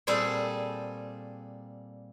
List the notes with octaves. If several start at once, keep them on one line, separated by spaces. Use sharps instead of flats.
A#2 G3 C4 G#4 A4 A5